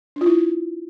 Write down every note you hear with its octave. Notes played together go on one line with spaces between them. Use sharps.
D4
F4
E4